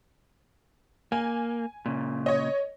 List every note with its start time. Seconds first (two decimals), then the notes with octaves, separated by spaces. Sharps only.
1.12 A#3 G#5
1.86 A#2 C#3
2.26 C#5 D#5